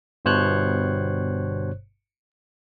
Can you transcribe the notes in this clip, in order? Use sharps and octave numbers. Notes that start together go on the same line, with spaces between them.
G1 G2 B2 C5 C#5 F#6